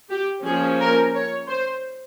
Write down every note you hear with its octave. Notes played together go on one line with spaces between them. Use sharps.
G4
F3 A#3 C#4 G#4
A#4
C#5
C5